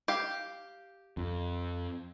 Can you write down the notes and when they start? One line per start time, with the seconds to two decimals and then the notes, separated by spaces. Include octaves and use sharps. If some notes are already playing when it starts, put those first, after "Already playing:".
0.08 G4 F5
1.17 F2